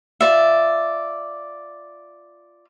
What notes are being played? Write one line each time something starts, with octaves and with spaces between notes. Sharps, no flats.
F4 D5 E5